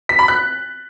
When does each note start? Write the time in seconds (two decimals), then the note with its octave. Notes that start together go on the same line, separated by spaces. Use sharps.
0.09 B6
0.19 B5
0.28 F#6